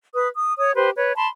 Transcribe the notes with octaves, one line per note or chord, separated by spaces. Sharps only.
B4 D#6
D#6
C#5 D#6
G4 B4 C5
B4 C#5
A5 B5 C6